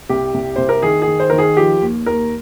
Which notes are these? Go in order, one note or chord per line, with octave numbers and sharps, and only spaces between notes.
C2 G4
C2
C2 C5
A#4
D#3 G#4
G#4
D#3
C5
D#3 A#4
G#4
F3 G4
D#2
D#2 A#4